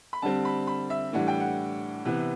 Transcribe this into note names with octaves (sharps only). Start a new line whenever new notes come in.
B5
D3 G3 C4 A5
B5
B5
E5
A2 E3 G3 D4 F#5
G5
F#5
C3 E3 B3